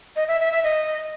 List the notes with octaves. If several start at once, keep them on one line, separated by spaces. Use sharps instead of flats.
D#5
E5
E5
E5
D#5